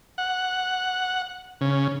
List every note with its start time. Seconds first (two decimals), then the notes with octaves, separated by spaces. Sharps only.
0.18 F#5
1.61 C#3